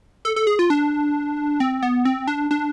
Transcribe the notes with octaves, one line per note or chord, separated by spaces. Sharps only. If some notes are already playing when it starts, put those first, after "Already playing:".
A4
A4
G#4
F4
D4
C4
B3
C4
D4
D4